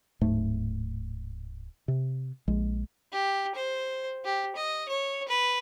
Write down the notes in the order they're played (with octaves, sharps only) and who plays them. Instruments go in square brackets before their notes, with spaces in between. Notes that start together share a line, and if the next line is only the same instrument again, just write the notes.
[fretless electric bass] D1 G#2 A3
C3
A#1 G#3
[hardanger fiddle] G4
C5
G4
D#5
C#5
B4